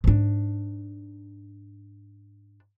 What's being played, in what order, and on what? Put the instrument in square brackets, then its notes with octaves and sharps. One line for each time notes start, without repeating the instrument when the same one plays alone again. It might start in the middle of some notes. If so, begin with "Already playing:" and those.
[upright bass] G#2 D4